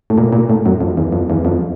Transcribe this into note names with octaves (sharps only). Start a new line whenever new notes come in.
A2
A#2
A#2
A2
F#2
F2
E2
F2
E2
F2